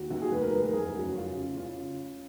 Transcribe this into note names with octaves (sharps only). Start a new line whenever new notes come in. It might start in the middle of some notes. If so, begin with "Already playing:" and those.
Already playing: D#2 F#4
D#2 F#4
G#4
F1 B4
A#4
F1 B4
A#4
F#1 G#4
C#3 F#4
C#3 F4
C#3
C#3 F4